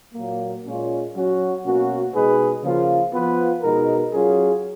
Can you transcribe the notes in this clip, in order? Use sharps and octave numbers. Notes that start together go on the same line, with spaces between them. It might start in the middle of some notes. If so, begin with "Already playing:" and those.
A#2 F#3 A#3
A#2 G#3 C#4 F4
F#3 C#4 F#4
B2 A#3 C#4 F#4
B2 G#3 D#4 G#4 B4
C#3 F3 A#3 F4
F3 B3 F4 B4
B2 G#3 D#4 A#4
F#3 C#4 F4 G#4